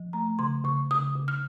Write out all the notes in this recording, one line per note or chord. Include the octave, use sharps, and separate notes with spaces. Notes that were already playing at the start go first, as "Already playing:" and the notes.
Already playing: F3
A3 A#5
C#3 C6
C#3 C#6
C#3 D#6
C#3
F6